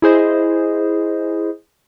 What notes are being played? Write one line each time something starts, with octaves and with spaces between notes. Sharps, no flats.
E4 G#4 C5 D#5